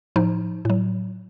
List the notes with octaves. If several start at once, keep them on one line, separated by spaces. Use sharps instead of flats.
A2 F3 D#4
A2 F#3